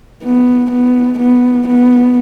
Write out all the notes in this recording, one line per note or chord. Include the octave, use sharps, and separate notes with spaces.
B3
B3
B3
B3